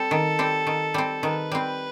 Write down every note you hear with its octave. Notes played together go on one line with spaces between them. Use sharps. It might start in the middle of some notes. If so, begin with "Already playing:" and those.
Already playing: G3 C4 A4
D#3
G3 C4
D#3
G3 C4
D#3 B4
G3 C4